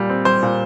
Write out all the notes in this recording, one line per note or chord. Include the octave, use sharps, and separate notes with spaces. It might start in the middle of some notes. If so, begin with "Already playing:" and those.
Already playing: A#2 G3
C4
G3 C5
A#2